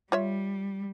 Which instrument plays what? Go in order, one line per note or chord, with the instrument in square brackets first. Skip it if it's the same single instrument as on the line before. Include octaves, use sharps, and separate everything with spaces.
[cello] G3 [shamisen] F4 C#5 E5